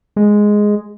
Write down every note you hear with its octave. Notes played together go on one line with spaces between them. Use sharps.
G#3